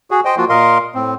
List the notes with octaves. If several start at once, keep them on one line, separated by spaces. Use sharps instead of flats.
F#4 G#4
C5 D#5 G5
F3 A#3 F4 F#4
A#2 A#4 D#5 F5 C6
A2 C4